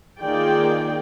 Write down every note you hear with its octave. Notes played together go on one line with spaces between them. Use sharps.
D#3 A#3 F4 G#4 D5 G5